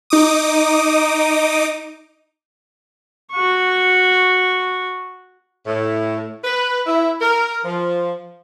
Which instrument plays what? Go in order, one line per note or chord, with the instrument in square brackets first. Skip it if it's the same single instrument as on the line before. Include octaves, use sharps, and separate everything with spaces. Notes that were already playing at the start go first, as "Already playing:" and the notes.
[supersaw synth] D#4 D6 D#6
[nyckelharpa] F#4 C#6
[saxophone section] A2
B4
E4
A#4
F3